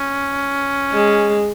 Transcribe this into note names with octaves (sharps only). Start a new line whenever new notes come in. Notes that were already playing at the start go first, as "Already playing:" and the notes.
Already playing: C#4
G#3